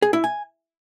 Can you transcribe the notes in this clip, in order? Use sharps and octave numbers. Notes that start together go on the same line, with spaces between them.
G#4
E4
G#5